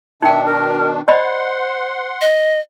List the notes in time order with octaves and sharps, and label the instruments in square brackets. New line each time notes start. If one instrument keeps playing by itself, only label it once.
[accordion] B2 D#3 D4 [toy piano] D#4 G5 [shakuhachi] E5
[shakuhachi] A#4
[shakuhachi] C5 [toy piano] D5 D#5 B5 [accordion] F#5 C6
[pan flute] D#5